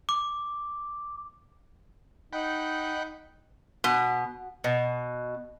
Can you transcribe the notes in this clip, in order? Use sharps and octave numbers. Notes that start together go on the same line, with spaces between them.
D6
D#4 F#5 G5 B5
B2
B2